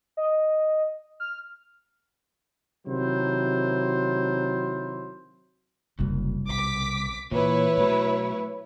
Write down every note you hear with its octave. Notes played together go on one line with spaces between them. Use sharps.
D#5
F6
C3 D#3 F#3 E4 C5
F#1 C2 F#3
B1 D6 B6
A#2 E3 E4 B4 C#5
B1 F#3 A3